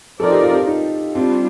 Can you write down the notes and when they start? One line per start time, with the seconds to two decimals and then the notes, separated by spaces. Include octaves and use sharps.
0.20 F3 C4 D#4 A4 A#4 D5
0.31 G4
0.43 F4
0.54 G4
0.68 D#4
1.15 G3 C4 D4 F4